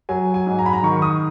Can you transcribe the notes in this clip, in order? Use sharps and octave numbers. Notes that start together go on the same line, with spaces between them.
F#3 G#5
G#5
G#2
A#5
B5
A#5
D#3 C#6
C#6
D#6